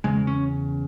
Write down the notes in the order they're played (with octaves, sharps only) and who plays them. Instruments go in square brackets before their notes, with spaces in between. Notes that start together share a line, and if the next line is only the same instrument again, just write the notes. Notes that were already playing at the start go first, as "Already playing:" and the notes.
[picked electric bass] E2 C#3 G#3
C#4